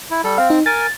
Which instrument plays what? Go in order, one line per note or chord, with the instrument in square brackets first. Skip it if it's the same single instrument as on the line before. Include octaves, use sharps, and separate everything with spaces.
[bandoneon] E4
G3 A4
[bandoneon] C4 [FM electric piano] F5
[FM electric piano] D#4
[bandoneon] A#4 G#5 [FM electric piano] A6